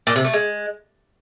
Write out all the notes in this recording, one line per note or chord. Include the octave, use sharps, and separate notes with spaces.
A#2
C3
A3
G#3